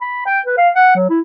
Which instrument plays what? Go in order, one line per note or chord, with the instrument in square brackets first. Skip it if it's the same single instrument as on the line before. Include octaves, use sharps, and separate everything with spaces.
[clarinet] B5
G5
B4
F5
F#5
F#3
E4